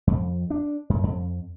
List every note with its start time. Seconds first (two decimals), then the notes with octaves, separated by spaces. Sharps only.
0.07 F2
0.50 D4
0.90 F#2
1.03 F2